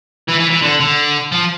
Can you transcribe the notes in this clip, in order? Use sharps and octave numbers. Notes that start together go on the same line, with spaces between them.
E3
E3
E3
D3
D3
F3